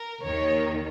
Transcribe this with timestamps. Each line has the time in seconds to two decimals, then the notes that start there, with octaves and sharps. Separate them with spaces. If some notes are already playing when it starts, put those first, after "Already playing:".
Already playing: A#4
0.24 D#2 D#3 C#5